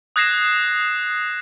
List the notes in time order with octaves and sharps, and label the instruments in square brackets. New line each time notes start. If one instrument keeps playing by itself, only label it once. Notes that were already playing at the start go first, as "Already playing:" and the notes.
[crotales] D#6 F#6 G#6 A#6 C7 E7